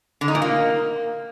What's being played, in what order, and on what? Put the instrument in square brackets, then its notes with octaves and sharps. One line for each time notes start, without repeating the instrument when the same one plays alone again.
[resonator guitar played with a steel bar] D3
D#4
A#2
A#3